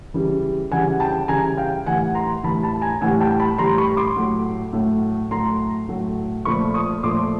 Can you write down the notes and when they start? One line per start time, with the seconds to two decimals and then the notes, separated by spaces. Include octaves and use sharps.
0.14 C#3 E3 G3
0.71 C#3 E3 G3 F#5 G#5
1.00 G5 A5
1.28 C#3 E3 G3 G#5 A#5
1.57 F5 G5
1.86 A2 E3 G3 F#5 G#5
2.15 A#5 C6
2.43 A2 E3 G3 A5 B5
2.63 A5 B5
2.81 G#5 A#5
3.01 A2 E3 G3 F#5 G#5
3.20 G5 A5
3.40 A5 B5
3.58 A2 E3 G3 A#5 C6
3.78 B5 C#6
3.97 C6 D6
4.16 A2 F#3 A3
4.73 A2 F#3 A3
5.31 A2 F#3 A3 A#5 C6
5.89 A2 F#3 A3
6.45 A#2 F3 A3 B5 C#6
6.74 C#6 D#6
7.03 A#2 F3 A3 C6 D6